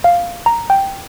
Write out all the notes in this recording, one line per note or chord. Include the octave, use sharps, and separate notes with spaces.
F5
A#5
G5